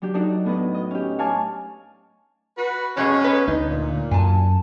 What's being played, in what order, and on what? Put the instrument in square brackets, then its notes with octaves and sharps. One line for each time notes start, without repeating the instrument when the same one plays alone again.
[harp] F#3 D4 G4
D4 D#4 F#4 A4 D5
A2 B3 B4 D#5
D#5
C#4 G4
C#5 F5 G#5 A5 D6
[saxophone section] F#4 B4
[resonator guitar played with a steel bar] F2 B2 G#3 [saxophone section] C#4
[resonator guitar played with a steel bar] B3 B4
[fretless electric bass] D2 D4 [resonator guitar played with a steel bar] D#4
[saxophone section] A#2
[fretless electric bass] F#2 [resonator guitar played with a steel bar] G#5 A5